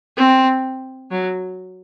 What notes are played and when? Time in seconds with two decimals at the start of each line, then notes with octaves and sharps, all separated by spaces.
0.17 C4
1.11 F#3